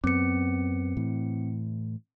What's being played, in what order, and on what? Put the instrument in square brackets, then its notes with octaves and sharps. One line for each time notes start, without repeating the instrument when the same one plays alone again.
[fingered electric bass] F#2 B3 [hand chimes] C4 C#7
[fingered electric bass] A2 E3